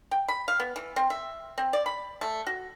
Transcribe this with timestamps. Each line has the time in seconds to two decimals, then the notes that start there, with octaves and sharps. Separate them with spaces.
0.11 G5
0.28 B5
0.48 F5
0.60 B3
0.76 E3
0.96 C4
1.10 E5
1.58 C4
1.73 D5
1.86 B5
2.21 A3
2.47 F#4